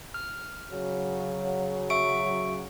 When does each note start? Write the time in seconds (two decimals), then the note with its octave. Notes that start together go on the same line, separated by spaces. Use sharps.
0.14 F6
0.70 C#3 F#3
1.90 E5 C#6 D7